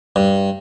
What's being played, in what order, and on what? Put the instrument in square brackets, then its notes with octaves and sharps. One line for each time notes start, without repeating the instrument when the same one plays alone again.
[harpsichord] G2